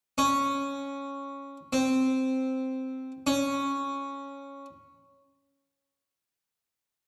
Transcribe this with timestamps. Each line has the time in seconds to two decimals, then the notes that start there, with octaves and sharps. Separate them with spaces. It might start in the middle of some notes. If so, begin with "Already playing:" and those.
0.18 C#4
1.73 C4
3.27 C#4